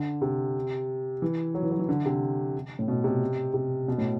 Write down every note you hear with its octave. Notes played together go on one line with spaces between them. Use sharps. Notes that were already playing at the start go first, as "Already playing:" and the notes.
Already playing: D3
C3
E3
F#3
E3
F#3
E3
D3
C3
A2
B2
C3
C3
B2
A2